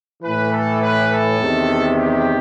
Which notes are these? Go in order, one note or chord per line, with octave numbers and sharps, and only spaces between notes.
A2 E3 B4
A4
B4
A4
E2 C3 D#3
G4